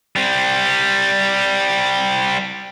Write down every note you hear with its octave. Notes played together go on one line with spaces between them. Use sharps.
G3 C4